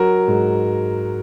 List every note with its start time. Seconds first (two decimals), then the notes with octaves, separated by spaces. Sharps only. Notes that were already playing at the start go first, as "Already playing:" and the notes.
Already playing: F#3 F#4 A#4
0.28 G#2